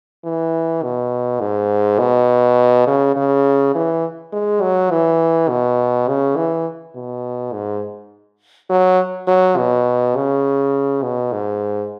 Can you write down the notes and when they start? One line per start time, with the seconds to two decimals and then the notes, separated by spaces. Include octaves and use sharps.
0.25 E3
0.83 B2
1.41 G#2
1.99 B2
2.87 C#3
3.16 C#3
3.75 E3
4.33 G#3
4.61 F#3
4.91 E3
5.49 B2
6.08 C#3
6.36 E3
6.95 B2
7.53 G#2
8.70 F#3
9.28 F#3
9.58 B2
10.16 C#3
11.03 B2
11.33 G#2